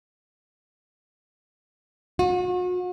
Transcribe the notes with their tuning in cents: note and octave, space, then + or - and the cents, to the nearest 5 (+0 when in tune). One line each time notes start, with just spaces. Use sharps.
F#4 -40